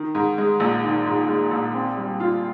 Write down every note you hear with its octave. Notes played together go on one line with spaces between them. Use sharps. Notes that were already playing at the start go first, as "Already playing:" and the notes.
Already playing: D#3
G#2
G#3
A#1
D#3
G#2
G#3
A#1
C4
G3
F4